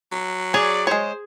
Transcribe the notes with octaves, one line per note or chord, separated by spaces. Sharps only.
F#3
G#4 C#5 D5
G#3 C5 C#5